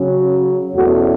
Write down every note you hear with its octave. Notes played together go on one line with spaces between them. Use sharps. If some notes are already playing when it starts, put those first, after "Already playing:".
Already playing: C#3 F#3 C#4
E2 B2 A3 C#4 F#4